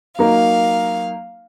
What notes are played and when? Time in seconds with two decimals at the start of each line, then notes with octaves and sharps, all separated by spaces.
0.19 F#3 A#3 D#4 A#4 F5